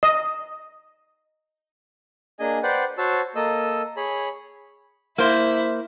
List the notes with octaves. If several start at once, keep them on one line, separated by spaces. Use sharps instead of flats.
D#5
A#3 D4 G#4 D#5 G#5
B4 C5 D5 F#5 G5
F#4 C5 C#5 A5 E6
A#3 A4 D#5 E6
G#4 C#5 B5
A#3 E4 C5